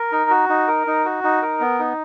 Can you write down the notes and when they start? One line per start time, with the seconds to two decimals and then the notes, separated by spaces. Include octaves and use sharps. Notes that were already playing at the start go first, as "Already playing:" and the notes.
Already playing: A#4
0.12 D#4
0.30 F#4
0.49 D#4
0.68 A#4
0.87 D#4
1.05 F#4
1.24 D#4
1.42 A#4
1.61 B3
1.79 D#4